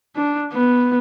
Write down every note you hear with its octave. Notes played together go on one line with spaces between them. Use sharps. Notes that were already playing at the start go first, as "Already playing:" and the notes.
D4
B3